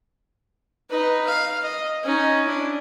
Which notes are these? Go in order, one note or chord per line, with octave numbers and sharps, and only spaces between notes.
D#4 B4
F5
D#5
C#4 D#4
D4 E4